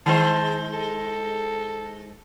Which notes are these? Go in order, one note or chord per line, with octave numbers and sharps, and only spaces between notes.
D#3 G#3 C5 A5
A4